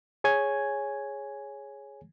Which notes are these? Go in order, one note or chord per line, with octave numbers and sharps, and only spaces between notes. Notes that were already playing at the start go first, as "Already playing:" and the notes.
G#4 C#5 G#5 G#6